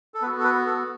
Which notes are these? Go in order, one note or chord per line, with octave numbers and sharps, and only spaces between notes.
A4
B3 F#4 B4
A4
B4
A4